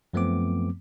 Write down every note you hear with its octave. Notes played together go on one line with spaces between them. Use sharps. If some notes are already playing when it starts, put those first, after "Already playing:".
F#2 F3 A3 B3 C4 D6